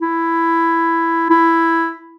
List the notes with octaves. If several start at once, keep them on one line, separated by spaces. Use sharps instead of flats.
E4
E4